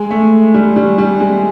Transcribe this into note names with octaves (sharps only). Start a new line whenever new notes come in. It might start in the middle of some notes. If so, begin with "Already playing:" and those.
Already playing: G#3
A3
G3
G3
G3
G#3